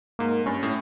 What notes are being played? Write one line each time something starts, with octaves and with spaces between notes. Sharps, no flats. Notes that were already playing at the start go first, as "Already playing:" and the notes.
G#2 A#3
G2 C#4
A2